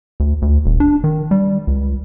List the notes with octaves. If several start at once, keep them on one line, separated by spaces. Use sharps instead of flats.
D2
D2
D#1
D4
D#3
G3
C#2